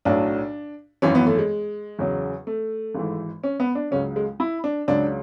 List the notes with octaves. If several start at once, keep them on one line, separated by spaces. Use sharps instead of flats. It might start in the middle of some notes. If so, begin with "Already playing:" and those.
B1 A2 F#3 D4
G#1 F#2 E3 C#4
B3
A3
G#3
E2 C#3 F#3
A3
G#1 G#2 E3
C#4
B3
D4
C#2 C#3 F#3 C#4
G#3
E4
D4
C#2 C#3 F#3 D4